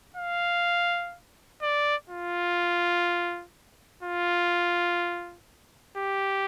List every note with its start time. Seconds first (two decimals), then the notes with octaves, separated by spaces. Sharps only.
0.17 F5
1.62 D5
2.10 F4
4.03 F4
5.97 G4